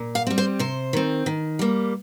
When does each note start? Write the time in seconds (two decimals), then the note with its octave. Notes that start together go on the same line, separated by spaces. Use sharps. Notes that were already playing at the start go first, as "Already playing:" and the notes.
Already playing: A#2
0.15 F5
0.27 G3 C4
0.38 C5
0.59 C3 C5
0.93 D#3 C4
1.26 D#3
1.59 G3 A#3